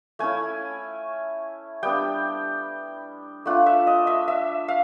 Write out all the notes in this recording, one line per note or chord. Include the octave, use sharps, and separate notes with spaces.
A3 C#4 E4 G#5
G3 B3 D4 G5
A3 D4 F4 F#5
E5
D#5
E5
E5
F5